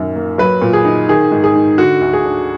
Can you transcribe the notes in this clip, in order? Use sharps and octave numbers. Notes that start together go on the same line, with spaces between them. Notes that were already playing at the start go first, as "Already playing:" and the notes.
Already playing: F#2 A#2 D#3
A#3
F#3 B4
A#2
G#4
D#4
D#3 G#4
G#2
G#4
D#4
D3 F#4
D2
G#4
D4